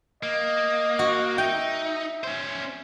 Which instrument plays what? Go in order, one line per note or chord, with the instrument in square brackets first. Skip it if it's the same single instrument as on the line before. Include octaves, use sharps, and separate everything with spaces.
[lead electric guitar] A#3 [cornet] D#5
[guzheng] F#4
[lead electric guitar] D#4 [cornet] E5 [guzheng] G5
[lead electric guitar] C#4 C5